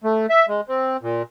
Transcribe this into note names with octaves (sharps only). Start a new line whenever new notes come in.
A3
E5
G#3
C4
A#2